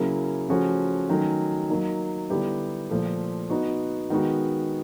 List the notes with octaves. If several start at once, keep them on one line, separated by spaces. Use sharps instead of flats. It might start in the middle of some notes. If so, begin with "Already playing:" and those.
Already playing: C#3 F#3 A#3 C#4 E4
C#3 F3 A3 C#4 F#4
D#3 F#3 A3 C#4
F#3 A#3 D#4
D3 G3 B3 E4 G4
A#2 F3 A3
B3 D#4 F#4
D#3 G#3 B3 D#4 F#4